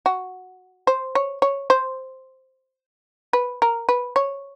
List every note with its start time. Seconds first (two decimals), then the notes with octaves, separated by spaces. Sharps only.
0.06 F#4
0.87 C5
1.15 C#5
1.42 C#5
1.70 C5
3.33 B4
3.62 A#4
3.89 B4
4.16 C#5